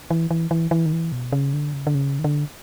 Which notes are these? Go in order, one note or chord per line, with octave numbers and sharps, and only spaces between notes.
E3
E3
E3
E3
D#3
E3
B2
C#3
D3
C#3
D3
C#3
D#3
D3